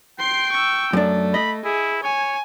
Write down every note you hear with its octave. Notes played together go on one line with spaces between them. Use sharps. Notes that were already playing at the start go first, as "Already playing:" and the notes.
G5 C6 C7
C#6 E6
F#2 A3 D4
D#5 B5
E4 G#4
C#5 G#5